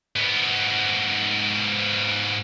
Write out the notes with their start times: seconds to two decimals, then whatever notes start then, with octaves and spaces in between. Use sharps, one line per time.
0.16 G#2 B3